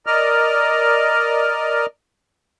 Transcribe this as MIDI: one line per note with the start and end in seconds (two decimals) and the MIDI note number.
0.06 1.86 70
0.06 1.86 74
0.06 1.86 75
0.06 1.86 89